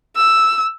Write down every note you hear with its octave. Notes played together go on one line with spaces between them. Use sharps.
E6